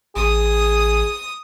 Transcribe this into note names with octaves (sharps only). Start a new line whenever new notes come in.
A1 G#4 D#6